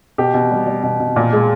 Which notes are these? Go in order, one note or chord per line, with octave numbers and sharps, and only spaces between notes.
B2 G4
B2
G3
G3
B2
B2
A#2
G#3